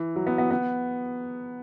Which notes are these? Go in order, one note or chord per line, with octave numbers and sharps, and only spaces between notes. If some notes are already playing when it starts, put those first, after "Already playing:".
Already playing: E3
F#3
B3
B3
B3